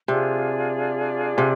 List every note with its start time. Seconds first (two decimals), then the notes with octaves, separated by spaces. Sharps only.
0.08 C3 D4 F4 G#4 D5
1.38 C3